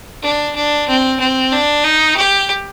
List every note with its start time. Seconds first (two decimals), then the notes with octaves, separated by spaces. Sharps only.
0.23 D4
0.55 D4
0.88 C4
1.19 C4
1.52 D4
1.84 D#4
2.16 G4